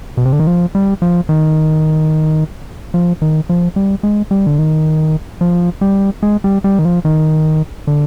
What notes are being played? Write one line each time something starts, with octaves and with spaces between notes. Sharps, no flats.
B2
C3
D3
D#3
F3
G3
F3
D#3
F3
D#3
F3
G3
G#3
G3
D3
D#3
F3
G3
G#3
G3
G3
D#3
F3
D#3
D3